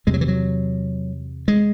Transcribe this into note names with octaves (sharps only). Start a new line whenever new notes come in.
E2 C3 G#3
F#3
E3
F#3
G#3